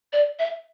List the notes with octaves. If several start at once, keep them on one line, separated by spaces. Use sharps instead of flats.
D5
E5